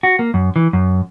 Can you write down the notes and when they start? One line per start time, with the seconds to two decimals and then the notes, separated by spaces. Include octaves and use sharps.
0.03 F#4
0.19 A#3
0.34 F#2
0.56 E3
0.73 F#2